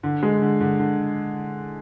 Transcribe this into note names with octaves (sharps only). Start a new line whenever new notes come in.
D3
G#3
D3
D3
D3